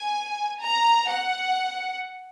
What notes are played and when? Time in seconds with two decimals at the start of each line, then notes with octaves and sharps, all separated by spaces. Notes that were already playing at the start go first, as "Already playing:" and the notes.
Already playing: G#5
0.61 A#5
1.09 F#5